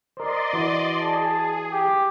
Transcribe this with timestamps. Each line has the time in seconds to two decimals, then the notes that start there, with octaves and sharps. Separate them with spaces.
0.17 A#4 C5 D5 D#5 C6
0.53 E3 F#4
0.99 G#4 A5
1.72 G4